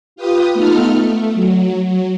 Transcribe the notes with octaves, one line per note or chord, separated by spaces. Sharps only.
F4 G4 B4 D#6
A3 B3 D#4 F4 A4 F6
A3
F#3
F#3